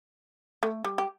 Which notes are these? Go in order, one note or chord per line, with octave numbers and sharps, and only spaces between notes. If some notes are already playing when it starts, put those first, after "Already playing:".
A3
G3
G4